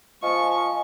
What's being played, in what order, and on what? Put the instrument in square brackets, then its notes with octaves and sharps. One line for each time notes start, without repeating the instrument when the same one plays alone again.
[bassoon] F3 [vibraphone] D#5 G#5 [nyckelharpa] C#6